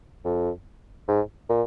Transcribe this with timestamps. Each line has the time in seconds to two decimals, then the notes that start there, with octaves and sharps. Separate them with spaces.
0.25 F2
1.08 G#2
1.50 A#2